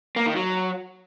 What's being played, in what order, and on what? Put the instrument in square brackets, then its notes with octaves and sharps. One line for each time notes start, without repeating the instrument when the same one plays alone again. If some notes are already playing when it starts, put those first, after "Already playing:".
[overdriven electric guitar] A#3
D#3
F#3